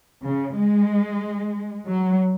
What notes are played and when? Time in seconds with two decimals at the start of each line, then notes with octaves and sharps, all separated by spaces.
0.24 C#3
0.57 G#3
1.88 F#3